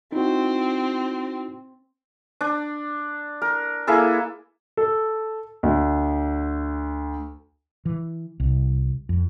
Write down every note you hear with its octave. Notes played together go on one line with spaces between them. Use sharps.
C4 D#4 E4 F#4
D4
A#4
A#3 E4 G#4 A4
A4
D2
E3
C2
F2